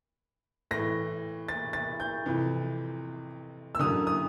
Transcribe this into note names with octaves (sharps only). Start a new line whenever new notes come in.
A2 E3 A#6
A6
A6
G6
F2 C3 E3
E6
F#2 D3 D#6
D#6